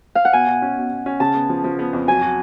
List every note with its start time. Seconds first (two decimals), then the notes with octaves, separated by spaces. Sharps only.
0.15 F5
0.25 F#5
0.33 B2 G#5
0.47 B2
0.62 C#4
0.77 B2
0.91 B2
1.06 C#4
1.20 C#3 A5
1.35 B3
1.49 F3
1.64 F3
1.79 B3
1.93 F2
2.07 F#3 G#5
2.22 F#4